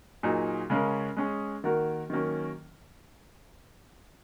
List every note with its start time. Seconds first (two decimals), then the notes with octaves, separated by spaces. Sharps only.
0.23 A#2 F#3 D#4 G#4
0.70 C#3 G#3 C#4 A#4
1.17 G#3 C#4 G#4
1.64 D#3 A#3 F#4 A#4
2.10 D#3 F#3 A#3 C#4